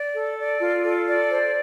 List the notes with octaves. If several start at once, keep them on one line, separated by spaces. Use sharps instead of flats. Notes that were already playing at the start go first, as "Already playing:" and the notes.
Already playing: D5
A4
D5
F4
A4
D5
C5